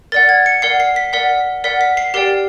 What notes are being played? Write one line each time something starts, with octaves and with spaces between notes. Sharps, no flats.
A#4 D5 F#5 A6
G#6
C#7
A#4 D5 F#5 C7
C7
B6
A#4 D5 F#5 B6
A#4 D5 F#5 B6
B6
C7
G4 A#4 D5 G5 C7